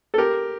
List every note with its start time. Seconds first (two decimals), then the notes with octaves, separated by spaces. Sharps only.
0.14 A4
0.18 G4 A#4